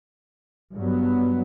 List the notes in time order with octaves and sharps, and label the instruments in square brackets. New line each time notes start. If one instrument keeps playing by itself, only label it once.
[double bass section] G2 F#3 B3